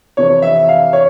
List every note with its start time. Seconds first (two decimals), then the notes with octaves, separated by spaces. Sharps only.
0.17 F2 C3 E3 C#5
0.42 E5
0.68 F5
0.93 C#5